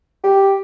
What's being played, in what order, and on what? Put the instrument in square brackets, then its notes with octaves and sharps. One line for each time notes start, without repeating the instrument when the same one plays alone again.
[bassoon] G4